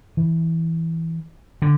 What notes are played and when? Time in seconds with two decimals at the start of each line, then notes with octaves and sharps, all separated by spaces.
0.17 E3
1.62 D3